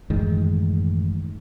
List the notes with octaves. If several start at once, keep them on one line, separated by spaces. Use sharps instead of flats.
A1 F#2 D#3 G#3